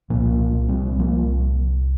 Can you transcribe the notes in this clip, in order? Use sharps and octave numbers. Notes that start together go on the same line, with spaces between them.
C2 A#2 F3 A#3
G3 C4
F3 A#3